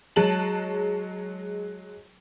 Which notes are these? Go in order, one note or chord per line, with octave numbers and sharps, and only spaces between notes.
F#3 G#3 A5 F#7